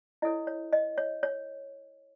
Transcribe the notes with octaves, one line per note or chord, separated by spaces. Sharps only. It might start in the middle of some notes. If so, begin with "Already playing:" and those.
E4 A4 C#5 D#5
C#5
D#5
C#5
C#5